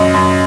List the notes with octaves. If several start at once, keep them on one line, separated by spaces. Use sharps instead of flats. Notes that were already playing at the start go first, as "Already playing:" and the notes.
Already playing: F#2 D#5
F#2